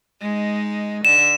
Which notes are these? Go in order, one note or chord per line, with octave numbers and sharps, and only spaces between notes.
G#3 D#4
D3 E7